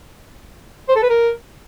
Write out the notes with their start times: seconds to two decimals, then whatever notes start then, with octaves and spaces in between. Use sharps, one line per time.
0.88 C5
0.95 A4
1.03 B4
1.10 A#4